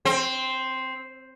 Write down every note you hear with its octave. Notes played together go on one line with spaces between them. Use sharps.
C4